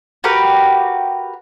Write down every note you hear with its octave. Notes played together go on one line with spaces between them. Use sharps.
F#4 G4 A#4 B4